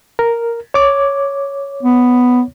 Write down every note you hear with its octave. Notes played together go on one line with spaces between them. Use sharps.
A#4
C#5 D6
B3